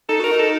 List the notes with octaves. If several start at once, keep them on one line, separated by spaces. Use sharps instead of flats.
D#4 A4
F#4 A#4
D#4
A4